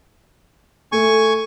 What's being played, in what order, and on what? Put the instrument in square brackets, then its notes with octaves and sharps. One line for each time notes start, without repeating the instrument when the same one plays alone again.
[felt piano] A3 [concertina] G#5 C#6